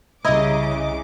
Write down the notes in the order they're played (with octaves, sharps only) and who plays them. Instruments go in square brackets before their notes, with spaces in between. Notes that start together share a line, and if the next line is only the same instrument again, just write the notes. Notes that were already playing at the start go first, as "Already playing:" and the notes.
[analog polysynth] C2 A#5 [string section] C#3 D6 [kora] E4 [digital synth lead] D#5